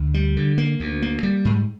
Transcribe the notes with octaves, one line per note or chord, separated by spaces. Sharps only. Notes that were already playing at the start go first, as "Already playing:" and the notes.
Already playing: D2
G3
D3
A#3
D2
A#3
G3
G#2